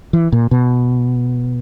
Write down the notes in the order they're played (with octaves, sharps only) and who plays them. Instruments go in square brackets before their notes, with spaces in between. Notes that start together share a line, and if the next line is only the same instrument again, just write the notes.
[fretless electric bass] E3
A#2
B2